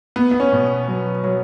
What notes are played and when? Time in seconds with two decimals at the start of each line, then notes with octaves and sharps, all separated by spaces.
0.16 B3
0.31 B3
0.40 C#4
0.52 B2
0.88 F#3
1.24 F#3